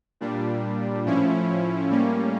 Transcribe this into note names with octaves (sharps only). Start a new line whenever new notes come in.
A#2 G3 D4
A2 F3 C#4 E4
A2 G3 A#3 C#4